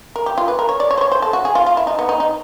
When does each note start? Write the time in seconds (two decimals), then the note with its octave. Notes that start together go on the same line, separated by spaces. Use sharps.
0.16 A#4
0.26 G4
0.38 F4
0.48 B4
0.59 A#4
0.69 C#5
0.80 D5
0.91 C#5
0.97 C5
1.01 C#5
1.12 C5
1.22 A4
1.33 F#4
1.45 G#4
1.55 F4
1.66 F4
1.77 E4
1.87 D#4
1.99 B3
2.09 D#4
2.20 D#4